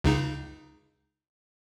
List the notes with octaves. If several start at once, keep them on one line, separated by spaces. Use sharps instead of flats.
C#2 C#3 D#4